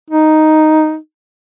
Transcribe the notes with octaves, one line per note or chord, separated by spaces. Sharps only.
D#4